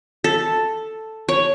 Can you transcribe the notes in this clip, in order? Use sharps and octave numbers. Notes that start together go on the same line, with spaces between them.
A4
C#5